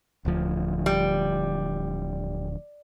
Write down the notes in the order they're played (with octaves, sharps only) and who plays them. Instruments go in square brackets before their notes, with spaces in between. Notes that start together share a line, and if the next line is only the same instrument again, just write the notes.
[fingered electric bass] D1 D2 F3
[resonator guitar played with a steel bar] G3